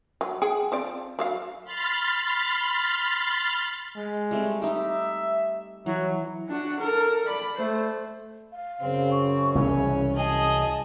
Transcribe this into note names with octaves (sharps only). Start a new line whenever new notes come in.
F#3
G#4 F#5 G5
F3 C4 D5
F#3 F#4 F5
B5 C6 F6 A6
G#3
G3 A3 C4
D#4 G4 E5
E3 F#3
D4 F#4
A4 A#4
D5 B5
A3 C5
F5
F#2 C#3 C4
C#6
C2 E3 F#3 C#4 G#5
G#4 D#5 A5